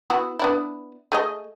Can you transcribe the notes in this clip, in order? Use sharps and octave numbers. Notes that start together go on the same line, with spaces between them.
B3 E4 F#4
B3 D4 E4
A3 G#4 D#5